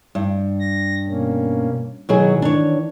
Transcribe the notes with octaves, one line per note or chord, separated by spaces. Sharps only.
G2
A#6
B2 A#3 C#4
B2 D#3 E3 F#3 G#4
D4 C#5